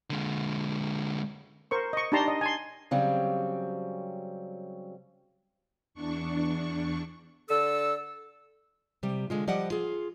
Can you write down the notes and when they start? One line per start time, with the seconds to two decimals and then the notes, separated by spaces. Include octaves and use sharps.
0.10 D3 G#3
1.71 A#4 C5 C#6
1.93 D#5 C#6
2.12 D4 D#4 G4 A5 A#5 C6
2.28 D#5
2.41 G#5 A5 C6
2.91 C#3 F#3 G3 C4
5.94 E2 D4 C#6
7.49 D3 A4 E6
9.03 C3 G3
9.30 D3 G#3 F4
9.48 F3 G3 D5 D#5 F#5
9.71 F4 G#4